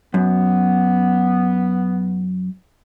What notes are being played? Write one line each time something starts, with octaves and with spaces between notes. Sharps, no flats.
F#2 B3